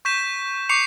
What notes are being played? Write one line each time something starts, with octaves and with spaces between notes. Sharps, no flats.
C#6 G6 B6 E7
C#6 D6 G6 C7 C#7 F7